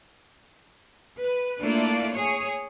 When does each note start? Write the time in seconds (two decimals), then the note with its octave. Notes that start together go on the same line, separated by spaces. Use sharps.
1.18 B4
1.61 A3 A#3 D4 E4 F4 D5
2.14 G#4 C#5